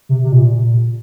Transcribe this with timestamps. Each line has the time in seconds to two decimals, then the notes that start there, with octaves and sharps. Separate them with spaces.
0.09 C3
0.24 C3
0.32 A#2